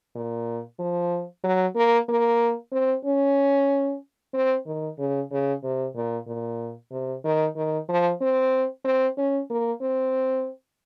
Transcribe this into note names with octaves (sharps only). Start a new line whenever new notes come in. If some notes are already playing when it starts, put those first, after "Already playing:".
A#2
F3
F#3
A#3
A#3
C4
C#4
C4
D#3
C#3
C#3
C3
A#2
A#2
C3
D#3
D#3
F3
C4
C4
C#4
A#3
C4